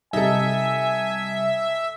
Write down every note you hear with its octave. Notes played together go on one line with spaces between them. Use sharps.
C3 G3 D#4 A4 E5 G#5